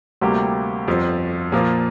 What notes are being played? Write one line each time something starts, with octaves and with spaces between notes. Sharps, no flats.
D2 C3 G3 A#3 G4
G1 F2 F3
A#2 F3 A#3